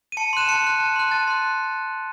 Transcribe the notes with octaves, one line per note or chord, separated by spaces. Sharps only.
D#7
A5 C#7
C6 F#6 E7
A5 C#7
C6 F#6
A5
C6 F#6
A5 A6
C6 F#6
C6